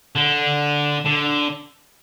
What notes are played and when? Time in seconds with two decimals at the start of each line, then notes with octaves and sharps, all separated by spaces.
0.15 D3
1.05 D3